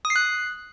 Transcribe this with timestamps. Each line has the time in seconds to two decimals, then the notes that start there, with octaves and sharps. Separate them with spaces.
0.05 D#6
0.10 C7
0.16 F#6